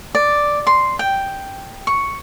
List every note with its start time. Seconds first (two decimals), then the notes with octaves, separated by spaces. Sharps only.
0.15 D5
0.67 C6
0.99 G5
1.87 C#6